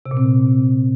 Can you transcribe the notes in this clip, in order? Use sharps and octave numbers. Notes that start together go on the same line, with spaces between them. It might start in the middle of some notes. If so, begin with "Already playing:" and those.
C3
A#2
C4